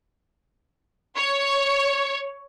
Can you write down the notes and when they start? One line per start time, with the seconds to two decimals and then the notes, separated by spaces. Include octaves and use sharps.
1.16 C#5